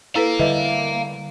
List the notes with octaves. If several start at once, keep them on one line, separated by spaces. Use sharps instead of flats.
E4 A4 B4 F5 A#5
D3 G3 B4 D#5 E5